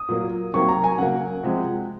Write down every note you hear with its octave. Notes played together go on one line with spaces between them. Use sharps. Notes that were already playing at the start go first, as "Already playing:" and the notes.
Already playing: D#6
A#2 F#3 A#3
C3 D#3 F#3 A#3 C#6
A#5
G#5
C#3 F#3 A#3 F#5
C3 F3 G#3